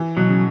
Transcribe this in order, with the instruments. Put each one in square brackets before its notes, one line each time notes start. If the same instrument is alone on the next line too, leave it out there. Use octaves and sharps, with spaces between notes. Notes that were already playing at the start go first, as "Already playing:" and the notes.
Already playing: [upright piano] E3
[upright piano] B2 [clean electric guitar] F#3
[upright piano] C#3